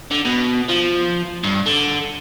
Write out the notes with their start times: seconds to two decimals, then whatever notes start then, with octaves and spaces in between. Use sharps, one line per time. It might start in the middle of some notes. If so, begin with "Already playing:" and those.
0.11 D3
0.25 B2
0.68 F3
1.44 G2
1.66 D3